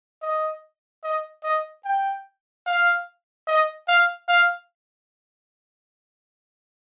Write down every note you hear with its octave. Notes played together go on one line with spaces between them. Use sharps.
D#5
D#5
D#5
G5
F5
D#5
F5
F5